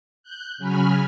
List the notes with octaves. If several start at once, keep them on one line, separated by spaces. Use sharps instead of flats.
F#6 G6
C#3 F#3 G#5 B5 F6